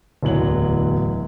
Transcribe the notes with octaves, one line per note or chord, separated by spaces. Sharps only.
D1 E2 F#3 F#7